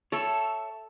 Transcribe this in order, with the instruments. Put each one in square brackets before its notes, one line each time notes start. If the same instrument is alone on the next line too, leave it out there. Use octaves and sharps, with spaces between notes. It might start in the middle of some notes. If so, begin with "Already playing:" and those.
[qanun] A4 [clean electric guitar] C#5 E5